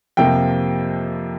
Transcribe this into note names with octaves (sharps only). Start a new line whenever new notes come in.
F2 C3 F3 A#3 G5